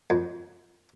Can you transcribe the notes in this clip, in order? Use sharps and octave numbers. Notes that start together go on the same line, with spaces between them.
F2